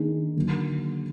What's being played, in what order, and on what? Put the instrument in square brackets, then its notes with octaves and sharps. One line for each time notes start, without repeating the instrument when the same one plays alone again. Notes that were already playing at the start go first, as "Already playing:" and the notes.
Already playing: [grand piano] D#3 A#3 D4 G#4
D3 F#3 A#3